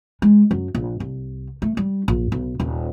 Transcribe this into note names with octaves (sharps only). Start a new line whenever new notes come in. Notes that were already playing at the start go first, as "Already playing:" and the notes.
G#3
F#2
A#1
C2
A3
G3
A#1
B1
D#1